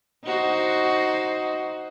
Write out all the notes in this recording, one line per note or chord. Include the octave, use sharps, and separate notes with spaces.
D#4 F#4 C5